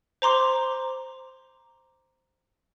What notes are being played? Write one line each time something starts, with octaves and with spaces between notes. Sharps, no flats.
C5 A#5 C6 D6